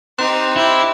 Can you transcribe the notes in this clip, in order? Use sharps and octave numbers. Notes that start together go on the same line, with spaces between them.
C4 D#4 G4 C6 F#6 E7
E4 G4